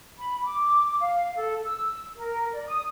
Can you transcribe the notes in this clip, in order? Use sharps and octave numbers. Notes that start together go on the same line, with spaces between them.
B5
D6
F5
A4
E6
A#4
D5
D#6